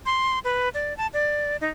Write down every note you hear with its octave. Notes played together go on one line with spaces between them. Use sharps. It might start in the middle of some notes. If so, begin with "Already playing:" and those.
C6
B4
D5
A5
D5
D#4